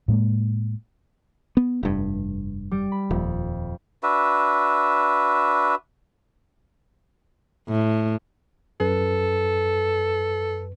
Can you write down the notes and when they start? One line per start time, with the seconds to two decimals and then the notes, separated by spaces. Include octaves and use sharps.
0.08 A2 G#3 A#3
1.57 B3
1.83 F1 G2
2.71 G3 D7
2.92 B5
3.11 D#1 F2
4.03 D4 F#4 B4 E5
7.68 A2
8.80 F#2 A4 B4